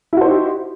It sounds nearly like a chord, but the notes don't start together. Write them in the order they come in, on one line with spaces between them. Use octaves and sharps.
E4 F#4 C5 D#4 G4